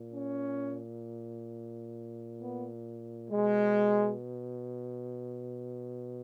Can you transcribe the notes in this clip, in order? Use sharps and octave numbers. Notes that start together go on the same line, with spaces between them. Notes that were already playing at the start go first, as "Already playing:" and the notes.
Already playing: A#2
C#4
B3
B2 G#3